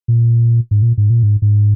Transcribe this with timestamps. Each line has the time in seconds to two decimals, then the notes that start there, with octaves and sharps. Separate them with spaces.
0.08 A#2
0.71 G#2
0.82 A#2
0.98 G#2
1.10 A#2
1.23 G#2
1.42 G#2